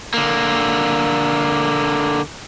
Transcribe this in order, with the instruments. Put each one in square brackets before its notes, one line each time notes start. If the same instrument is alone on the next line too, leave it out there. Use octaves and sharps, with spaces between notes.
[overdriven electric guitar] D3 A#3